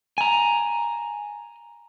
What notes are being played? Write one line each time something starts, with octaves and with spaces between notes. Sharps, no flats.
G#5 A#5